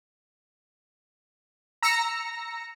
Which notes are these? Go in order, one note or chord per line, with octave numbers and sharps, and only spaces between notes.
A#5 E6 A#6 C#7